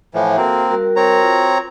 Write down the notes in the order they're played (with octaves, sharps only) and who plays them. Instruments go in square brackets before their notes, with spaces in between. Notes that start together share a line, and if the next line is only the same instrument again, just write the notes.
[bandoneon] A2 E3 F3 [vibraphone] E5 F#5
[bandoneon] A#3 C4 [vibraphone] F#4 A4
[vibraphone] G3 F#4 A#4
[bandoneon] C4 C#5 A#5
[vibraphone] F4 F#4